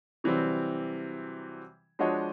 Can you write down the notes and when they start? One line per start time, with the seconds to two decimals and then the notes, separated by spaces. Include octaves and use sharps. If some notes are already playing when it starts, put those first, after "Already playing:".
0.24 C3 E3 F#3 G3 C4
1.99 F3 G#3 D4 F#4 C#5 D#5